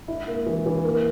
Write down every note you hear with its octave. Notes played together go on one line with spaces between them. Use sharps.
E4
A#3
E3
E3
A#3